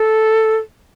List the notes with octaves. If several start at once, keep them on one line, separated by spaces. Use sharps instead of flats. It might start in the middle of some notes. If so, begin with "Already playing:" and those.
Already playing: A4